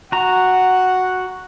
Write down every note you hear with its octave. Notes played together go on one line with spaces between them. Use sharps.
F#4 F#5 A#5